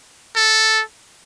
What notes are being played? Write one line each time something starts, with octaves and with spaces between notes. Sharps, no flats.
A4